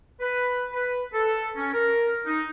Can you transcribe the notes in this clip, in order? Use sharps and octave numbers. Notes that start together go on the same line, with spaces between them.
B4
B4
A4
C#4
A#4
D#4